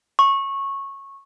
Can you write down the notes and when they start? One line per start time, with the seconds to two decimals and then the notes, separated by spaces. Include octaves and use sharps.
0.19 C#6